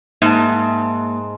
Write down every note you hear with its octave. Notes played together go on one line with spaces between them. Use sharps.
G#2 A#3 E5 A5